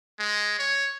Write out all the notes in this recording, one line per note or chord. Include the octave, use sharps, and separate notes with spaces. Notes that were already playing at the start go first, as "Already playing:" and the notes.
G#3
C#5